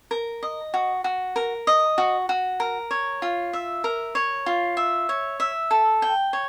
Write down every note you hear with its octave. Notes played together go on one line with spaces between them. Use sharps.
A#4
D#5
F#4
F#4
A#4
D#5
F#4
F#4
A#4
C#5
F4
E5
A#4
C#5
F4
E5
C#5
E5
A4
G5
C#5